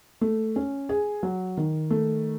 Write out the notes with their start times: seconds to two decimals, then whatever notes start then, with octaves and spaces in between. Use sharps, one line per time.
0.21 A3
0.56 C#4
0.89 G#4
1.23 F#3
1.57 D#3
1.91 A3